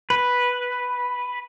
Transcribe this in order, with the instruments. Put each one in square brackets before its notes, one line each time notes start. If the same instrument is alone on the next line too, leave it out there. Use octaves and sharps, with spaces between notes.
[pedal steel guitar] B4